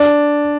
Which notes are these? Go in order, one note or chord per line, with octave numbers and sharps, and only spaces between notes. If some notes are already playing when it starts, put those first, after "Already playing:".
Already playing: D4